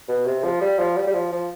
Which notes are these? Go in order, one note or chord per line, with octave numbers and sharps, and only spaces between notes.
B2
C3
F3
G3
F3
G3
G3
F3
F3